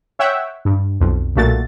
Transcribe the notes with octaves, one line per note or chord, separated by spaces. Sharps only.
C#5 E5 F#5 G5
G2
B1 F2
B1 A#2 A3 A#3 F#4 A6